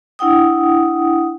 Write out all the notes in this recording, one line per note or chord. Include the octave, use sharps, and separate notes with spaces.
D4 E4 F#5 G5 D#6